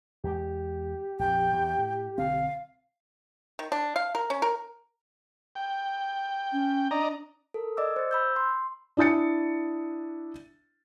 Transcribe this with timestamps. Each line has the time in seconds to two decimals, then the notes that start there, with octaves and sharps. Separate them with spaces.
0.24 E2 G#3 G4
1.19 A#1 F2 G5
1.53 E2
1.78 A2
2.18 B1 D3 C4 F5
3.59 D#3
3.72 D4
3.96 F5
4.15 A#4
4.30 C#4
4.42 A#4
5.55 G5
6.52 C#4
6.91 D4 D5 D#5 A#5
7.54 A4 A#4
7.77 D5 D#5 D6 E6
7.96 C5 A6
8.11 B5 E6 G6
8.36 C6
8.97 D4 E4 D#6 A6 C#7